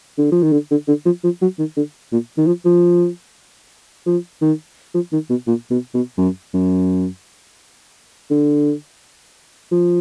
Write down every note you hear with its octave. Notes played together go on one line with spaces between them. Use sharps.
D3
F3
D#3
D3
D3
D3
F3
F3
F#3
D#3
D3
A#2
D#3
F3
F3
F3
D#3
F3
D#3
B2
A#2
B2
B2
F#2
F#2
D3
F3